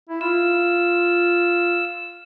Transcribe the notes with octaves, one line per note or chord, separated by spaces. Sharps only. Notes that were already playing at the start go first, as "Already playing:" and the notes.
E4
F4 E6